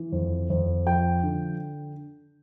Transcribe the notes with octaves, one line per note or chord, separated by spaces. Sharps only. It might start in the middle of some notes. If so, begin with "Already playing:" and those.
Already playing: E3
F2
F2
F3 G5
D3